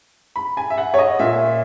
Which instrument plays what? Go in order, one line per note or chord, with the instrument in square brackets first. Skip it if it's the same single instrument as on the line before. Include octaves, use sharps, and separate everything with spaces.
[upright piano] B5
G#5
E5
F#5
C#5
D#5
A#2 E5